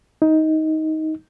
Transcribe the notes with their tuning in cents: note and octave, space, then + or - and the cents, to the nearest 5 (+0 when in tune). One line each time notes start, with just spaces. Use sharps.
D#4 +15